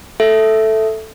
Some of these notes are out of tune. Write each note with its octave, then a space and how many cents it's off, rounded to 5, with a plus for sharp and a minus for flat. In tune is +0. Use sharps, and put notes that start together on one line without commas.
A4 +0 E5 +0